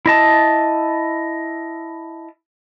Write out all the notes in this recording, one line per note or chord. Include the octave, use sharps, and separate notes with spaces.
E4 D#5 A5